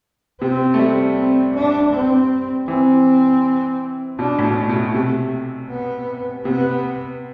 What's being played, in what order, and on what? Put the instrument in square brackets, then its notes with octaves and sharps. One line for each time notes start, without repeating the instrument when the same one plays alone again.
[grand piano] C3 [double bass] C4
[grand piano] A3
G3
[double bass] C4
D4
C4
[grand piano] E3 [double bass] C4
[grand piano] B2 [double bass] D4
[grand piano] A2
B2
[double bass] A3
[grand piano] B2
C3
[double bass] B3
[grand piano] C3 [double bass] B3